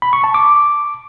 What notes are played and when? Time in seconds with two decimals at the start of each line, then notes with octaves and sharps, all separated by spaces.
0.02 B5
0.13 C#6
0.24 A5
0.34 D6